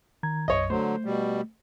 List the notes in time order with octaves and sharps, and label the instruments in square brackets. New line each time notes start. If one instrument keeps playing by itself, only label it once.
[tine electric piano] D#3 A#5 G#6
[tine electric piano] B1 F#2 [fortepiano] C#5 D#5
[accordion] D3 F#3 [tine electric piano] A3 [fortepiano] C5
[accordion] B2 G3